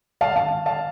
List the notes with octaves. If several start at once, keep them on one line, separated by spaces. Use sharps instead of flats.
F5 A5
F5 A5
F5 A5